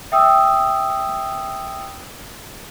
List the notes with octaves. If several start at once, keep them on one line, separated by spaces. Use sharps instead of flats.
E5 G5 D#6 E6